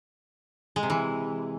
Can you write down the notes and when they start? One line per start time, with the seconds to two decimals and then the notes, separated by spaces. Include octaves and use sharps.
0.76 G#3
0.83 C3
0.90 E3